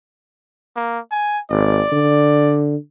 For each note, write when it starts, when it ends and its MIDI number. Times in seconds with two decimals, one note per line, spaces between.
0.76 0.99 58
1.11 1.39 80
1.51 1.81 32
1.51 2.61 74
1.93 2.76 50